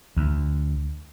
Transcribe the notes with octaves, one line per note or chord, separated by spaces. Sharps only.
D2